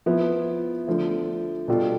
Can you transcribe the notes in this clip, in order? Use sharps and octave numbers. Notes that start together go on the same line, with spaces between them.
F3 B3 E4
D3 F3 A3
B2 G3 D4 F4 A4